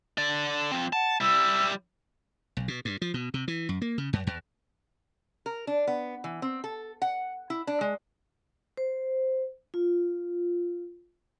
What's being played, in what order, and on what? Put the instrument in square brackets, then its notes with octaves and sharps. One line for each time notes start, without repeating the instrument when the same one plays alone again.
[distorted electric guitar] D3 D5
F3 C4
[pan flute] F#5 [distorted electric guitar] A5
[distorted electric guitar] G3 E4 [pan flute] E6
[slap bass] B1
B2
G2
F3
B2
C3
E3
F#2
A#3
C#3
F#2
E2
[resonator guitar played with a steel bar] A#4
D4
B3
E3
C4
A4
F#5
E4
D4
G#3
[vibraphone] C5
F4